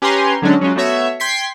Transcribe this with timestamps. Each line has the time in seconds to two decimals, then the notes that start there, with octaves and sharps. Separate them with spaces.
0.02 C#4 G4 B4 G#5 A#5 C6
0.42 D3 F#3 G#3 C#4 D4
0.61 F#3 G#3 C#4 F4
0.76 A3 B3 F#4 C#5 E5
1.20 G5 C6 G#6 B6 C7